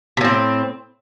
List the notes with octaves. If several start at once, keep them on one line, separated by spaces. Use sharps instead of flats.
A2 C3 C4